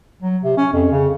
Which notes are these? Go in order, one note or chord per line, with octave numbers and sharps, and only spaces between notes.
F#3
C3
C#4
F2
C#3